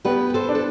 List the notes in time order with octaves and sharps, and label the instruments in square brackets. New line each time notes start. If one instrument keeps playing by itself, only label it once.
[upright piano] B3 [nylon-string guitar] G4 B4
[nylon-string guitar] B4
A4 C5
[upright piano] D4
[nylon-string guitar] A4